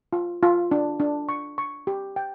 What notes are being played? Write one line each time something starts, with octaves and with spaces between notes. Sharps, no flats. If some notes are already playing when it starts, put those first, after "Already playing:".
F4
F4
D4
D4
C#6
C#6
G4
G5